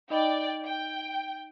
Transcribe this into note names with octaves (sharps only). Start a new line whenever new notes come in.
D#4 D5 D#5 G5 B5
G5